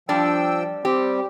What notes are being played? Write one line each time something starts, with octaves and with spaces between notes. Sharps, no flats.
F3 G3 D4 G5 E6
G3 C4 G4